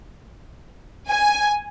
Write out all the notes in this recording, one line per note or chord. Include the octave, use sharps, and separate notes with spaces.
G#5